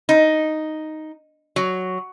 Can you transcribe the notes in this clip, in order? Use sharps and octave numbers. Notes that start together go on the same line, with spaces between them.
D#4
F#3